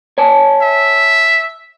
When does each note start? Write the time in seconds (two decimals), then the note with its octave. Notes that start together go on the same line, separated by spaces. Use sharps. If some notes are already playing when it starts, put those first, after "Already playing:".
0.18 C#5 G#5 A5
0.61 E5